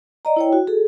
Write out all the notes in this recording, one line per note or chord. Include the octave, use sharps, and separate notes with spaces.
D5 D#5 A#5
E4 C#5 G5
F#4
G#4 A4